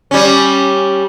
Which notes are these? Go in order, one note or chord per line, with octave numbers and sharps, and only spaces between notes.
G3 C#4